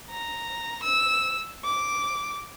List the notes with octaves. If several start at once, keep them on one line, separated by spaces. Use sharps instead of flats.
A#5
E6
D6